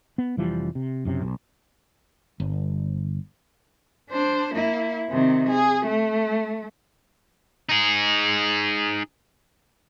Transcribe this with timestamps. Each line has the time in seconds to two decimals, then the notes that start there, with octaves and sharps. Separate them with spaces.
0.18 B3
0.37 F1 E3 F3 G3
0.75 C3
1.05 F#1 F#2 C3
1.22 B1
2.40 G1
4.10 D4 C5
4.55 A#3 E4
5.10 C3 D#3
5.50 G#4
5.86 A3
7.69 D#4 G#4